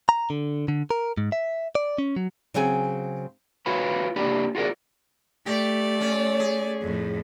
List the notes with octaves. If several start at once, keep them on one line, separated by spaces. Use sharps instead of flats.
A#5
D3
D3
A#4
G#2
E5
D5
C#4
F#3
C#3 F#3 C4 G#4 G#5
F4 F#4 B4 C#5 F5 B5
A#3 D4 G4 D5 B5
F4 F#4 G#4 A#4 D5
A3 G4 D5
C#4
G#4
F2 A2